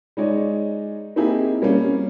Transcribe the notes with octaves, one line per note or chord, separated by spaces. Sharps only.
G#3 D#4 C#5 D5
A#3 C4 D#4 E4 G4 G#4
G3 A#3 C4 C#4